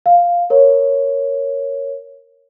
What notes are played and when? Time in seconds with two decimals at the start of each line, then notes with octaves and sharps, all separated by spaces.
0.06 F5
0.50 A#4 C#5